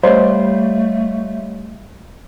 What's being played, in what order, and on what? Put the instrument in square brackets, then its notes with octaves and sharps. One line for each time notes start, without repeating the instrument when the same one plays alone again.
[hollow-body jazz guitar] G3 [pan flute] A3 [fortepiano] C5 [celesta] C#5 D#5 F5